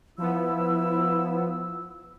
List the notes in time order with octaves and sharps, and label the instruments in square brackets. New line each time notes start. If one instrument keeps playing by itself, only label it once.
[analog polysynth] F3 B3 [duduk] E4 [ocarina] E6